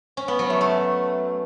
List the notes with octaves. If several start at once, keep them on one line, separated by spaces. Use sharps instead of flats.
C#4
B3
F#3
A3
A3